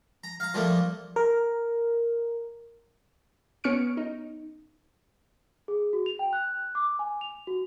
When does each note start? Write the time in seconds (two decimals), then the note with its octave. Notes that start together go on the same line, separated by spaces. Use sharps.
0.24 A#5
0.40 F5 A#5
0.54 F3 G3 A3 A#3
1.16 A#4
3.64 B3 C#4 C#6 F6 C#7 D7
3.97 D#4
5.68 G#4
5.93 F#4
6.06 F7
6.19 G5
6.33 F#6
6.75 D6
6.99 G#5
7.21 F7
7.47 F#4